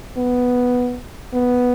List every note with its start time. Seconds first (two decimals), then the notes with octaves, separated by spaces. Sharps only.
0.17 B3
1.34 B3